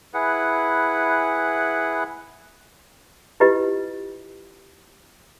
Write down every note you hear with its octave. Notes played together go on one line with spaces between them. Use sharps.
E4 G#4 B4 F#5
E4 F4 G4 B4 D#5